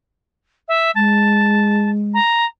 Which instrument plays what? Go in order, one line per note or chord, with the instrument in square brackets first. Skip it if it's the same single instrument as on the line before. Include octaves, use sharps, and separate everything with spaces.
[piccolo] E5
[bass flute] G#3 [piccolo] A5
[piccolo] A#5